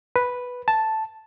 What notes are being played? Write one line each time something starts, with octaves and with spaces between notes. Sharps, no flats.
B4
A5